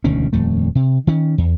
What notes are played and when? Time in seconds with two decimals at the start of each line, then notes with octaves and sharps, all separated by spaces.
0.04 E1 D2 D#3 C#4
0.33 D#1 F2 A3
0.75 C3
1.07 D#3 C#4
1.38 E2